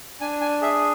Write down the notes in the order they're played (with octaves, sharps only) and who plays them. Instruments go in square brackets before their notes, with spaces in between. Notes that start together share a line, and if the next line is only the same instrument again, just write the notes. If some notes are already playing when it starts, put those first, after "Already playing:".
[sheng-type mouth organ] D4 G#5
G#5
G#4 E5